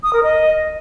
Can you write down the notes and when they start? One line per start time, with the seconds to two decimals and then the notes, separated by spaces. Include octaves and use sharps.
0.03 D#6
0.13 A#4
0.23 D#5